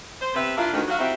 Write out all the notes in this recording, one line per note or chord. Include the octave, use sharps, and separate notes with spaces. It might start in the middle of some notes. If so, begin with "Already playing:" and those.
C5
C3 B3 B4 E5
A#3 D4 E4 F4
D2 D#3
F#3 F#4 F5
C4 D#4 E4 F#4 G4 E5